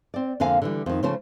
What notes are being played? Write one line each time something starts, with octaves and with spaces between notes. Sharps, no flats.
C4 D5
F2 D3 A#3 F5 G#5
D3 E3 G3
F2 D#3
C#3 F3 A3 C#4 C5